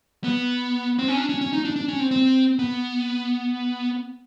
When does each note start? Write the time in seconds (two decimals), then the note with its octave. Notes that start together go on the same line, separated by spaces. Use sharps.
0.24 B3
0.99 C4
1.08 C#4
1.17 D4
1.29 C#4
1.41 C#4
1.53 D#4
1.65 D4
1.76 D4
1.88 C#4
2.00 C4
2.11 C4
2.59 B3